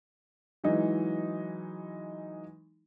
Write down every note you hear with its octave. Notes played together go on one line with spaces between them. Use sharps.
E3 F#3 G#3 D#4 E4